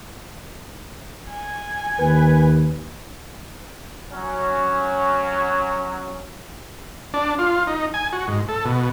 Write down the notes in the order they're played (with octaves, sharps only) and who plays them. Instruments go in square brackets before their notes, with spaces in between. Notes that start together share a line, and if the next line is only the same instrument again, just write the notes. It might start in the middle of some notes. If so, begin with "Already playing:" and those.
[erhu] G#5
[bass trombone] D#2 [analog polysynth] B4
[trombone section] F#3 C#4
[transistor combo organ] D4
F4
D#4
G#5
F#4
G#2
A4
B2